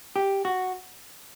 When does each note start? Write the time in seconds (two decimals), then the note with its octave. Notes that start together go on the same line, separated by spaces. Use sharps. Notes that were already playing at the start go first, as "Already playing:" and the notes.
0.16 G4
0.45 F#4